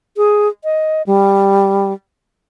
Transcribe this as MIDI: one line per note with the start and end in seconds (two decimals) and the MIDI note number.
0.17 0.48 68
0.64 1.02 75
1.07 1.93 55